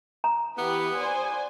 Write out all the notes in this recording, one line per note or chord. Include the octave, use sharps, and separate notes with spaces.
A#5
E3 B3 G4 B4
C5 D5 G#5